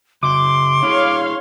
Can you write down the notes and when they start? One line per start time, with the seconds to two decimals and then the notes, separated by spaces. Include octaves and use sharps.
0.23 C#3 F#4 C6 D6
0.83 D4 E4 G#4 C#5 F5